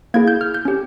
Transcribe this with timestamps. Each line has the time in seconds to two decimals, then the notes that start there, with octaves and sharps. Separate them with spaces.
0.14 A#3 E4 G#4 G#6
0.28 G6
0.41 F6
0.54 G6
0.65 C#4 G4